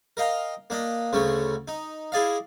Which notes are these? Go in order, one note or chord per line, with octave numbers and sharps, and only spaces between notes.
A#4 D#5 F5 G5 A#5
A#3 D4 D#5
D2 C#3 A3 C#4
D#4
E4 G#4 D5 D#5 F5